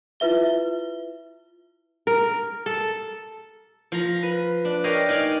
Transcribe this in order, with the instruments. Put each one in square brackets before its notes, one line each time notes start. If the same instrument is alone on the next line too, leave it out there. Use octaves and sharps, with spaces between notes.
[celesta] E4 F4 B4 E5 G7
[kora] A#4
A4
[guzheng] F3 A#5
B4
D4
G4 A#4 C#5 D#5 F5
D#4 D5 F5 G#5